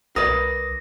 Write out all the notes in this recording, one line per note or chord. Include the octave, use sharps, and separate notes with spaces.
C2 A#4 B4 D5 D#6 A#6